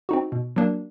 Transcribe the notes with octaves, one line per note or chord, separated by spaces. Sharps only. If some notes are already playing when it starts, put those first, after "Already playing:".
C4 D#4 F#4
B2
F#3 A#3 D4